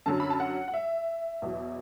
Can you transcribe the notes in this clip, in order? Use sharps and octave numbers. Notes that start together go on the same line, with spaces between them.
F#2 D3 F#3 A5
B5
A5
F#5
F#5
E5
E2 B2 F#3